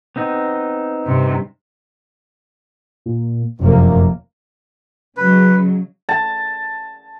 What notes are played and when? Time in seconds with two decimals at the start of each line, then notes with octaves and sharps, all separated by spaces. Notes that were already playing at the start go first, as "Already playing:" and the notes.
0.16 B3 C4 D#4
1.05 G2 C3
3.06 A#2
3.60 F1 F#2 C3 A#3
5.17 C#3 F#3 G#3 B4
6.09 A5